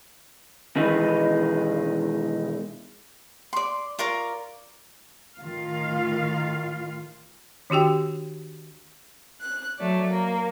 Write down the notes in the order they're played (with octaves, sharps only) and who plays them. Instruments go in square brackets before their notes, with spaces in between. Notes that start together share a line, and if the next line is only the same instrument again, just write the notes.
[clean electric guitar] B2 D#3 E3 G#3 D#4 B4
[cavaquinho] D5 C6
F4 A#4 D5 C#6
[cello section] A2 D#3 F4 F5
[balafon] D#3 D4 F#4 G4 G5
[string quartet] F#6
F#3 A3 D5
A#3